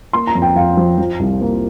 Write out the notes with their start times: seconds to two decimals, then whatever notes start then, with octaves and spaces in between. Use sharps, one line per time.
0.13 A#3 C6
0.27 A#5
0.35 F2
0.42 G5
0.56 F2 F5
0.77 F3
0.98 F3
1.19 C2
1.41 A#3